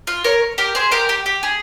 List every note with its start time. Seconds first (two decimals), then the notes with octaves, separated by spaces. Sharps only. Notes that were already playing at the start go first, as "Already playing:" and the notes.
0.07 F4
0.24 A#4 C#5
0.58 G4 A#4
0.75 G#4 C5
0.91 G4 A#4
1.09 G4
1.26 G4
1.43 G#4